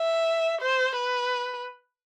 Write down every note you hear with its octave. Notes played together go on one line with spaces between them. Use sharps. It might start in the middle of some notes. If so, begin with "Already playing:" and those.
Already playing: E5
C5
B4